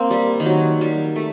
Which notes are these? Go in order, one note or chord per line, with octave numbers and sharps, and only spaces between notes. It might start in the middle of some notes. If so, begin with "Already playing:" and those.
Already playing: A#3 C4
G3
D#3
F#3
G3
A3